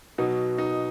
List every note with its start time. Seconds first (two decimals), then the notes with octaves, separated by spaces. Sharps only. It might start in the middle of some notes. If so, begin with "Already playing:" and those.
0.18 B2 F#3 D#4
0.58 D#4